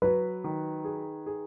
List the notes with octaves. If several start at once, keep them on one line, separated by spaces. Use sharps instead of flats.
F#3 B4
D#3
G#4
G#4